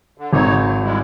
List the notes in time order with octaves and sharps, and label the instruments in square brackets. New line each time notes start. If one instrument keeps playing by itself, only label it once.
[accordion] D3
[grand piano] G#1 [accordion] C4 D#4 C#5
[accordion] F#3
G3 G#3 E4